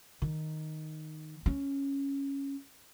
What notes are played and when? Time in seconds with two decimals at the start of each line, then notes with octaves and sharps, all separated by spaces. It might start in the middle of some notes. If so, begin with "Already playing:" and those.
0.22 D#3
1.46 C#4